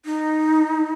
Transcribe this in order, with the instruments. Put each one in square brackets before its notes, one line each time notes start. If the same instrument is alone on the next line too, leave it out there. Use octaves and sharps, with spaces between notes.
[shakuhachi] D#4